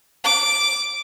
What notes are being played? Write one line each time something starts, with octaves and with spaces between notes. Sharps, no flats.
D6